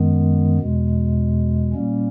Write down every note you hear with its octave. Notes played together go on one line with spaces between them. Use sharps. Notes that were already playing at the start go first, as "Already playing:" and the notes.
Already playing: F#2 D#3 G#3 B3
E2 B2 G#3
A#2 G3 A#3 C#4